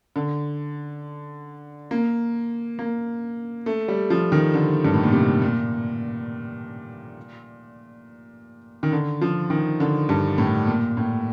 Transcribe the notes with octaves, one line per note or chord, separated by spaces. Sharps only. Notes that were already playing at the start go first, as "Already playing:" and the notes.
D3
A#3
A#3
A3
G3
F3
D#3
D3
G2
A2
A#2
C3
A#2
D#3
D3
F3
D#3
D3
G2
A2
A#2
A2